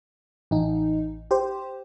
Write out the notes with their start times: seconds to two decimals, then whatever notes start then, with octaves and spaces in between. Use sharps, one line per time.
0.51 A1 D#4
1.31 G4 C5